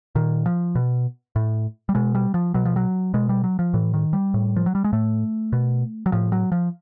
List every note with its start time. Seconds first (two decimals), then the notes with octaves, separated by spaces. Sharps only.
0.15 A#2 D#3
0.46 F3
0.75 B2
1.36 A2
1.89 G3
1.95 B2 G#3
2.15 G3
2.34 F3
2.54 B2 F#3
2.65 F3
2.76 F#3
3.14 B2 G#3
3.29 G3
3.44 F#3
3.59 F3
3.74 A2 E3
3.94 D#3
4.13 G3
4.34 A2
4.56 F3
4.66 F#3
4.75 G3
4.84 G#3
4.93 A2 A3
5.53 B2
6.06 F#3
6.12 A2 F3
6.32 F#3
6.52 F3